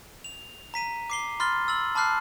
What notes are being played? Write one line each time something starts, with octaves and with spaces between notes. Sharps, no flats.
F7
A#5 B6 D#7
D6 C7 G7
B5 C6 F6 A6 G7
E6 A6 F#7
A5 B5 D6 F6 F#6 C7